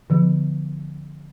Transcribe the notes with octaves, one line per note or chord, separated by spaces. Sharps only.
D3 F3 B3